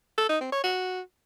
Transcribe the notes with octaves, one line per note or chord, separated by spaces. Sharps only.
A4
D#4
C4
C#5
F#4